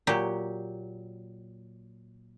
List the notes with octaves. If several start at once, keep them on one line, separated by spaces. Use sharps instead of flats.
A#2 F#3 G4